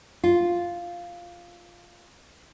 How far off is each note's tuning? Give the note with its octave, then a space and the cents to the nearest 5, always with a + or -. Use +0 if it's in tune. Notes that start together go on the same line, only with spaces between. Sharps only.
F4 +0